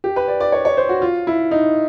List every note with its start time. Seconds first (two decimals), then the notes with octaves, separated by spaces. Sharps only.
0.04 G4
0.16 B4
0.28 D5
0.40 D5
0.52 C#5
0.65 C#5
0.77 C5
0.89 F#4
1.02 F4
1.27 E4
1.51 D#4